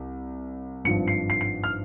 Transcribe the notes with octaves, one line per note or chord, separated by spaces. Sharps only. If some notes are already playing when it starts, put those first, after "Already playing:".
Already playing: C2
G#1 G2 F3 C#7
C7
C7
C7
F6